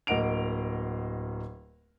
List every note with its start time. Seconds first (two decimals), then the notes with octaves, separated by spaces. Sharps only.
0.07 D1 A#3 D#5 F#5 D7 F7